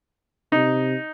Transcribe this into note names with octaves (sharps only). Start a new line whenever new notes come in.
C3 D#4